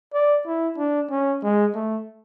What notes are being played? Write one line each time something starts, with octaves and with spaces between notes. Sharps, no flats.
D5
E4
D4
C#4
G#3
A3